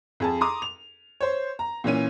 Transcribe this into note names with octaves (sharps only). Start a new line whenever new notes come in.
F2 G#4 A5
A#5 C6 D6 D#6
F7
C5 C#5
A#5
A#2 E3 C#4 D#7